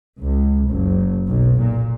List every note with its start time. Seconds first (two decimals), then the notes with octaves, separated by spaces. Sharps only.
0.19 C#2
0.68 F#1
1.28 B1
1.61 A#2